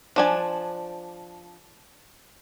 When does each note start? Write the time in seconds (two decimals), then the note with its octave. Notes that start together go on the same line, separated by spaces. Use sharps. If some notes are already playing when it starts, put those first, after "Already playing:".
0.16 F3 D4 G#5